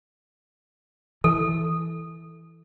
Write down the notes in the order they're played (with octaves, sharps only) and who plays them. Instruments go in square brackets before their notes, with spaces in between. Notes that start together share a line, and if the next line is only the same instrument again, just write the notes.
[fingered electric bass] E3 [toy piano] A4